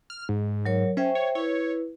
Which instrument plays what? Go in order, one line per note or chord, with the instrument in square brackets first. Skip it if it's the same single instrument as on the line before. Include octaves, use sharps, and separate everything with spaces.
[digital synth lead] F6
G#2
[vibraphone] F#3 A#4 C#5
[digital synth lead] C#4 [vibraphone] C5 E5 G5
[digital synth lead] C#5
[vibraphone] E4 B4 [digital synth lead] C#5